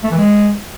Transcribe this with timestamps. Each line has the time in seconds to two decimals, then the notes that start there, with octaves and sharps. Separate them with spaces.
0.04 A3
0.11 E3
0.18 G#3